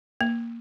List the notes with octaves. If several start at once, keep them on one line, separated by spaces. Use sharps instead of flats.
A#3